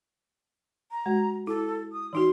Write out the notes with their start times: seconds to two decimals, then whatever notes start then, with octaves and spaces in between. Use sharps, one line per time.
0.91 A#5
1.06 G#3 F#4
1.47 E4 A4
1.92 D#6
2.13 E3 D#4 F#4 C6